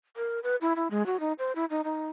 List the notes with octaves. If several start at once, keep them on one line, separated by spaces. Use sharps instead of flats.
A#4
B4
E4
E4
G#3
F#4
D#4
C5
E4
D#4
D#4